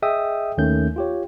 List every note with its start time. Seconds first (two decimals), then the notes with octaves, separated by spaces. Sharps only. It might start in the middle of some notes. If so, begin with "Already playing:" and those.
0.02 G#4 D#5 E5 G5 D#6 E6
0.58 D#2 D#3 A3 C#4 G6
0.96 F4 G4 C#5